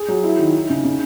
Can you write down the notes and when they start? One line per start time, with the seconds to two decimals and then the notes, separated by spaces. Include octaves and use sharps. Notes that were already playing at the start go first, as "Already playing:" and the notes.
Already playing: G#4
0.08 F#3
0.24 E4
0.39 D#3
0.54 D#4
0.70 C#3
0.84 C#3